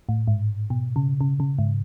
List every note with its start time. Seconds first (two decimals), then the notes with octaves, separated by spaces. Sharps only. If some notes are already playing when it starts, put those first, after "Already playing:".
0.09 A2
0.27 G#2
0.70 B2
0.96 C#3
1.21 C#3
1.40 C#3
1.58 G#2